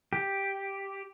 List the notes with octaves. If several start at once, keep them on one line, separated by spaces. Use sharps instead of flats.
G4